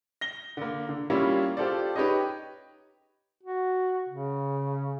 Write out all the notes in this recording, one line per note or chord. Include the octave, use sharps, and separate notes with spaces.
A#6 G7
D3 A#3
D3
G3 A#3 C#4 E4 F4
F4 G4 A4 C5 D5
D#4 G4 B4 C#5 D#5
F#4
C#3